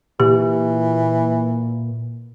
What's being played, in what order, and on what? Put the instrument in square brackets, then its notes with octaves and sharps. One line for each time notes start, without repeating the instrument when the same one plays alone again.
[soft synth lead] A#2 [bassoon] E3 [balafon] G4